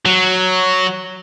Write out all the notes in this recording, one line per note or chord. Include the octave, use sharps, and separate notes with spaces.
F#3